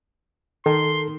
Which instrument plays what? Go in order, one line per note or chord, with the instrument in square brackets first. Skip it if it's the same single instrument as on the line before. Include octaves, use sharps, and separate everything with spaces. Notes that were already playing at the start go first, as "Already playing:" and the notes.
[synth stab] D#3 [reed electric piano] A4 [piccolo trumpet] C6